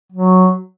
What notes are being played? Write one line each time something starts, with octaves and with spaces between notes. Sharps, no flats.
F#3